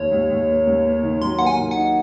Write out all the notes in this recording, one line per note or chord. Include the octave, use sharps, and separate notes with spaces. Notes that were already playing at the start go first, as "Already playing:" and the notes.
Already playing: D#2 D#3 C#5
D#2
D#2
A#3
D#2
A#3
D#3
F#3 C6
A#3 F#5
G#5
D#3
F#5
D#4